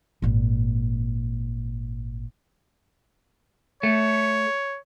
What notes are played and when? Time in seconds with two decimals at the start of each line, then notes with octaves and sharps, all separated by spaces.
0.22 G#1 A#2
3.83 A3 C#5